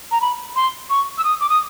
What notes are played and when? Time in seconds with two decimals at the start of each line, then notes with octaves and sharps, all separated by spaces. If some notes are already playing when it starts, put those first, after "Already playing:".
0.12 A#5
0.21 B5
0.56 C6
0.90 C#6
1.18 E6
1.24 D#6
1.41 D6
1.50 D#6